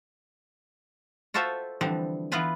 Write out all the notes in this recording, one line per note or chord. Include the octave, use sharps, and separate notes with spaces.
F4 F#4 A4 C5 E5 F5
D3 E3 F3 G3 C4
E3 B3 E4 F4 B4 G#5